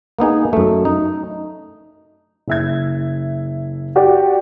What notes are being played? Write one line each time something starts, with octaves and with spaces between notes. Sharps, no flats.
A#3 B3 D#4 G#4
F#2 A3
D#4
F#1 E5 G#6
F#4 G4 D5 G5